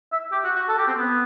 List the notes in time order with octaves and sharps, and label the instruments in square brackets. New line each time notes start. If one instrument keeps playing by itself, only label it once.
[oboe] E5
G4
F#4
F#4
A4
G4
C4
B3